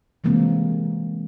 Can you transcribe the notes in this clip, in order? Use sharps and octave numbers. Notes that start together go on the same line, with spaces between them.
C3 E3 G#3 A#3 C4